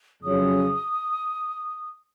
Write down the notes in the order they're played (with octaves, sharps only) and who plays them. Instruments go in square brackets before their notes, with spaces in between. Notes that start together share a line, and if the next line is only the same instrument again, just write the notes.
[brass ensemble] F2 C#3 F#3 C#4 [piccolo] D#6